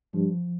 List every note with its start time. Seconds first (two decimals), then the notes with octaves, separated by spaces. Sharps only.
0.14 G2 F3